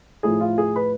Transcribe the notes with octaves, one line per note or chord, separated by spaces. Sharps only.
A2 F3 A3 E4 G#4
F4
G#4
B4